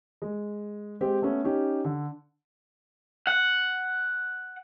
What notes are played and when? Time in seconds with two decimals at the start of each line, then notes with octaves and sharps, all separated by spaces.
0.22 G#3
1.01 G#3 C4 G4
1.22 A3 B3 C#4
1.45 C#4 D#4 G4
1.85 D3
3.27 F#5